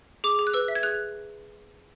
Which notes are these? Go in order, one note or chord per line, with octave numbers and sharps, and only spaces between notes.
G#4 D6
G#4
F#6
B4 E6
E5
G#6
G#4 F#6